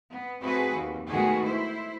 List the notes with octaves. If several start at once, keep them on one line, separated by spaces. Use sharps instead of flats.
B3
A3 C4 F#4 G#4 B4
D#2
B2 D#3 G#3 A3 F#4 G#4
E4 C5